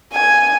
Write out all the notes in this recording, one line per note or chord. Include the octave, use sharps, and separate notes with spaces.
G#5